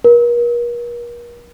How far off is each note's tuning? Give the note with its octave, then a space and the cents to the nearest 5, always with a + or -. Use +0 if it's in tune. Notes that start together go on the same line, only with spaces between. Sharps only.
A#4 +40